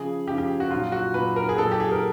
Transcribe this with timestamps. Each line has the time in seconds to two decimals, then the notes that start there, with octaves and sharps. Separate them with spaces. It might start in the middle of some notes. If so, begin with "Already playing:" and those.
Already playing: C#3 F3 G#4
0.27 F3 G4
0.30 C#3
0.38 G4
0.60 F#4
0.71 A#2 F#3 F4
0.92 F#4
1.14 A#2 F#3 B4
1.36 A#4
1.49 G#4
1.58 A#2 F#3 A4
1.72 G4
1.80 G#4
1.92 A#4